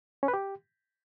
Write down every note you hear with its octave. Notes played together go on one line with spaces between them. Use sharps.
C#4
B4
G4